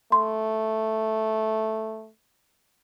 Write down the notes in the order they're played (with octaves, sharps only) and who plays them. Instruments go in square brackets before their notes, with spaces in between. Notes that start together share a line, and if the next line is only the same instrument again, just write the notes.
[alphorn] A3 [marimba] C6